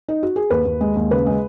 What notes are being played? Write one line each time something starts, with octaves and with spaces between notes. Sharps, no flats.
D#4
F#4
G#4
D#2 B4
D#2
G#3
D#2
C#3 B4
G#3